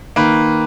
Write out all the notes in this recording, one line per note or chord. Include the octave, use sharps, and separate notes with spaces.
D#3 A#3 B4